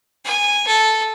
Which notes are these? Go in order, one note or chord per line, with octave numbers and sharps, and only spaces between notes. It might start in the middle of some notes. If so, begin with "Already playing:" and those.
G#5
A4